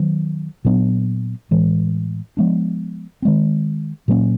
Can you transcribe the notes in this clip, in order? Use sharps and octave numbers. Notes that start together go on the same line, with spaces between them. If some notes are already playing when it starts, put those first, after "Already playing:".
Already playing: D#3 F#3 B3
A#2 F#3 B3 D4
A2 E3 G#3
F3 G#3 B3 D4
D#3 G#3 C4
A#2 F#3 A#3 C#4